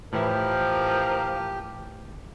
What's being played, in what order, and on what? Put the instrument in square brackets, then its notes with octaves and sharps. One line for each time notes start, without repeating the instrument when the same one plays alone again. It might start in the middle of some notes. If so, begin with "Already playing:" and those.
[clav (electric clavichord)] A2 E3 E4 [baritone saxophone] F3 [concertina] G4 [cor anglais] A#4